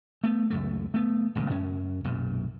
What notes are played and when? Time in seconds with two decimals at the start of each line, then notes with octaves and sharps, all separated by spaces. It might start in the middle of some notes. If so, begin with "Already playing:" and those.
0.24 A3 B3
0.50 C#2 F#2 A3
0.94 A3 B3
1.35 D#1 C#2 A#2
1.50 F#2 C#4
2.04 B1 F#2 A#2